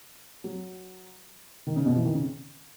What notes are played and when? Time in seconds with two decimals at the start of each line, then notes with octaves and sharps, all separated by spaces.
0.44 F#3
1.67 D#3
1.76 C#3
1.86 B2
1.96 E3
2.05 D#3
2.14 C#3